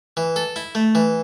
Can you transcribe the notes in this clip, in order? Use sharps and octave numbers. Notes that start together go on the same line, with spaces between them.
E3
A4
E4
A3
E3